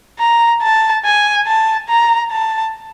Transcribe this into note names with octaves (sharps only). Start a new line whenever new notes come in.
A#5
A5
G#5
A5
A#5
A5